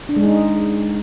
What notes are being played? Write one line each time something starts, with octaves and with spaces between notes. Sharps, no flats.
D4
G#3
D#4